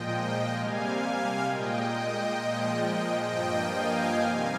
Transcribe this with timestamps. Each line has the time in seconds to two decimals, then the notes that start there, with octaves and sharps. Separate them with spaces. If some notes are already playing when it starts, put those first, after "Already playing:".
Already playing: A#2 F3 G#3 D#5 G5
0.53 C3 G3 A#3 F5 G#5
1.44 A#2 G#3 D#5 G5
1.90 D#5 G5
2.36 A#2 F3 G#3
3.27 G2 F3 A#3 D#5 G5
3.72 F5 G#5
4.18 C3 D#3 G3